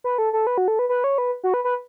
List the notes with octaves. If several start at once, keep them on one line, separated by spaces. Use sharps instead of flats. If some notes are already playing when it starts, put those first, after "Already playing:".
B4
A4
A4
B4
F#4
A4
B4
B4
C#5
B4
F#4
B4
B4